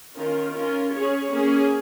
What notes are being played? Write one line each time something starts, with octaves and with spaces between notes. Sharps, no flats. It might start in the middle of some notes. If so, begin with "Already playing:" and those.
D#3 C#4 F4 A#4
C#4 F4 A#4
C#4 G#4 C#5
A#3 C#4 G#4